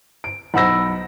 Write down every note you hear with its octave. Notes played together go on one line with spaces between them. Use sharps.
D7
B1 F#5 B5 E6 A#6